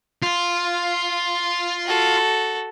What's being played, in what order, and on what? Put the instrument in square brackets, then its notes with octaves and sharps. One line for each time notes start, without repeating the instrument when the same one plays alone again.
[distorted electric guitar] F4
[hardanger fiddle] F#4 A4